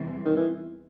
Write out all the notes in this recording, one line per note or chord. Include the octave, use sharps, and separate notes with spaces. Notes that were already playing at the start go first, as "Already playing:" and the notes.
Already playing: E2 C3 E3 G3 C4
D#3
E3